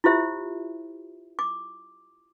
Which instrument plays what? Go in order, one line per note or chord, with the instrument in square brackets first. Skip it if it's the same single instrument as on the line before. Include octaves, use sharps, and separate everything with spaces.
[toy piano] E4 F4 G4 C5 E5
D6